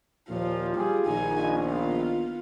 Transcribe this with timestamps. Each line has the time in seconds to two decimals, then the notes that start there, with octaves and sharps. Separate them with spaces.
0.29 D#2 A#2 F3 F4
0.76 G3 F4 G4 G#4
1.06 A#1 D#3 D#4 G#5
1.59 B3 F4